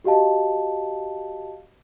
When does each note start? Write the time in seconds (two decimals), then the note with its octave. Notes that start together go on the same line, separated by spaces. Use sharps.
0.04 F#4 G4 D#5 F5 A5